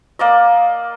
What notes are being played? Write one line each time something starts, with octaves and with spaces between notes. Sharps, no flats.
A#3 D5 D#5